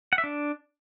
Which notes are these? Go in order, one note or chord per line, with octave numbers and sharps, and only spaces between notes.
F#5
E5
D4